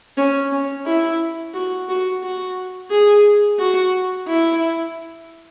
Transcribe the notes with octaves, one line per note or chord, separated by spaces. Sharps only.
C#4
C#4
E4
F#4
F#4
F#4
G#4
F#4
E4